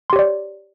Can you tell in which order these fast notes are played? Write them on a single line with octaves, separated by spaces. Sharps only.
C6 G4 C#5 D5